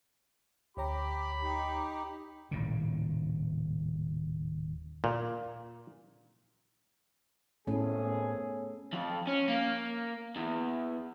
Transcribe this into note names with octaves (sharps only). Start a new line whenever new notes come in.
D2 G4 C#5 A#5 B5
D#4 G4
D#1 A2 C#3
A#2
G#1 A2 A3 B3 C#4 G#4 A4 C#5
F2
C#4
A#3
E2